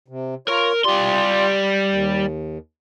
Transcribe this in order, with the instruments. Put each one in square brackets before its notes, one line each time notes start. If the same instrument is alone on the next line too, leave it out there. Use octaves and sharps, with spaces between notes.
[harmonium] C3
[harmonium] F4 C#5 [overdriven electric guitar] A#4
[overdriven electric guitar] G3 C6 [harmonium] F4 G4 D5
[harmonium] D#2